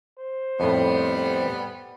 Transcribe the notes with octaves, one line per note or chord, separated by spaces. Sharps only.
C5
F2 A2 G3 B3